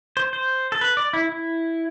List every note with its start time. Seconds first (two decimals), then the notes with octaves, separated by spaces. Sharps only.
0.17 C5
0.33 C5
0.72 A4
0.81 B4
0.97 D5
1.13 E4
1.29 E4